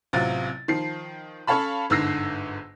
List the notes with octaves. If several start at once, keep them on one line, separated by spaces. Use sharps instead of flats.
A1 C3 F#3 F4 A6
D#3 F3 C7
C#4 A4 C#5 F5 A5 B5
G1 G#2 D3 E6 A#6 C7